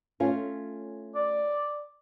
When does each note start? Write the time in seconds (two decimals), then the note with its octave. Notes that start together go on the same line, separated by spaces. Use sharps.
0.20 A3 C#4 F4
1.15 D5